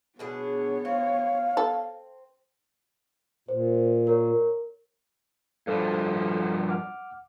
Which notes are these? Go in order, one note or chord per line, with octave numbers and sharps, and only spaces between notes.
B2 B3 D4 G#4 C#5
C4 F5
A4
A#2 C5
A#4 C#5
G2 F3 A4 D5
F#5 D6 F6